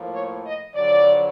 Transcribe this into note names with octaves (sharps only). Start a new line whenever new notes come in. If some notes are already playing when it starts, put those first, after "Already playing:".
Already playing: A2 F3 A#3
C#5
D#5
F2 D3 F#3 D5